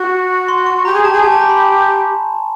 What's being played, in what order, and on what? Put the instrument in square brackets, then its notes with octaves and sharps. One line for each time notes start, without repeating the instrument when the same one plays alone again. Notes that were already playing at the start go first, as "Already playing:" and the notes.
Already playing: [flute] F#4 [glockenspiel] C#6
[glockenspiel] C6
C#6
[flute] G4 [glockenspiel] A#5
[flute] G#4
[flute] G4 [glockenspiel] A5
[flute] G#4
[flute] G4 [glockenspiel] G#5
[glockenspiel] A5
A#5
B5